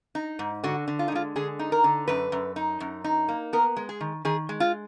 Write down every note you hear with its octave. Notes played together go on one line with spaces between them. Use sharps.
D#4
G#2
D3 F#4
D3
F4
D#4
G#3 F4
D3 G#4
D#4
A#4
D3
F#2 B4
F#2
D#4
F#2
D#4
A#3
B3 A#4
G#3
G#4
D#3
D#3 G#4
G#3
F4